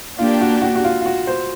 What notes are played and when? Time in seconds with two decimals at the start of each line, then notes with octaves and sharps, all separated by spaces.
0.19 A#3 D4 F4 G4
0.41 F#4
0.62 F#4
0.76 F#4
0.84 F4
1.01 F4
1.06 F#4
1.27 C5